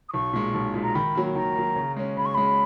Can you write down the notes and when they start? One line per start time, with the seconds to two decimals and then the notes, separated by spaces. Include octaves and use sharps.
0.09 D#6
0.13 B1 C#6
0.33 A#2 G#3
0.54 B1
0.74 A#2 G#3
0.83 A#5
0.95 D#3 B5
1.15 F#3 A#3
1.35 D#3 A#5
1.56 F#3 A#3
1.76 C#3
1.97 G#3 C#4
2.17 C#3 B5
2.26 C#6
2.34 G#3 C#4 B5